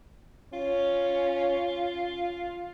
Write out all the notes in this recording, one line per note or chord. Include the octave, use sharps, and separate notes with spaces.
C#4 F4